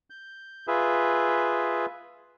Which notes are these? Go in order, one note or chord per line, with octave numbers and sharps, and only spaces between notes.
G6
F4 G#4 B4 E5